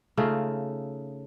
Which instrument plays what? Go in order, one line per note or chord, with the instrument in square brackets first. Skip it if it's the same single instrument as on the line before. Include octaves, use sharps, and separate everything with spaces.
[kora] C#3 A3 D#4 F4